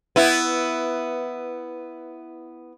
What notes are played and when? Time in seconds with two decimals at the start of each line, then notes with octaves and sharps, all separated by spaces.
0.16 B3 E4